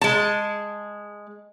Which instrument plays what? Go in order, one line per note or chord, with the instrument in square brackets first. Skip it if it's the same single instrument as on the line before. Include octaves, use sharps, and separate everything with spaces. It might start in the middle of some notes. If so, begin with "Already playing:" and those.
[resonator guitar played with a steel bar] G#3 A5